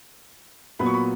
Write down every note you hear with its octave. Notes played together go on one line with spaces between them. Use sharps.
A#2 F#3 B3 B5
C#6
B5